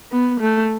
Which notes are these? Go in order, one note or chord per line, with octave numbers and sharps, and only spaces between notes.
B3
A3